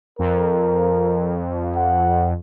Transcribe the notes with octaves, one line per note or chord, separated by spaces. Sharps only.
F2 A#4
F#5